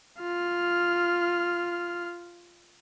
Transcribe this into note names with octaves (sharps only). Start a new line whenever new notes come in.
F4 F6